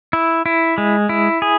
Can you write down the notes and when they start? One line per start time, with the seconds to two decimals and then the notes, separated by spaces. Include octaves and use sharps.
0.13 E4
0.46 E4
0.78 G#3
1.09 E4
1.42 G#4